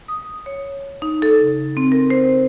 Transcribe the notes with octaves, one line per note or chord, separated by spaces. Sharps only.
D#6
C#5
D#4
A4
C#3
C4
A#4
C5